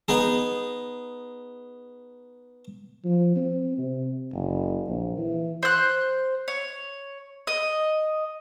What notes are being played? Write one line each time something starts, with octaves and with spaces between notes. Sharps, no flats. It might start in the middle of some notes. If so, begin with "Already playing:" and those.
B3 D#4 G#4
F3
C4
C3
F#1
A#1
E3
C5 F#6
C#5
D#5